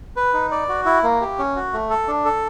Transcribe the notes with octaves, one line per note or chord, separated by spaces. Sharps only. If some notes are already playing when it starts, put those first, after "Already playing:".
B4
D#4
D5
F#4
E4
A#3
G4
C#4
F#4
A3
A4
D4
A4